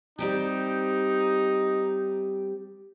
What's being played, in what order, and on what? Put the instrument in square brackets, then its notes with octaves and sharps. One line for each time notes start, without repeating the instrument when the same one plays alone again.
[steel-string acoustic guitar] G3 C4 G4 [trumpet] D#4